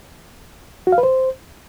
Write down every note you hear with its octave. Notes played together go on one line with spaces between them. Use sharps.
F#4
F5
B4
C5